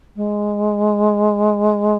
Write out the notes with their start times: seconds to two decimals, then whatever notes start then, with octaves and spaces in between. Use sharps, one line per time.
0.16 G#3